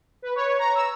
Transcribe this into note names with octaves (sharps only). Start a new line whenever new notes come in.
B4
C#5
A#5
E6